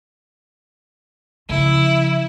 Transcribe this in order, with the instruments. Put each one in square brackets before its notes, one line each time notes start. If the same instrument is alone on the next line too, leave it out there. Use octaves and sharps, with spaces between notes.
[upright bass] C#3 F3 [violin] E4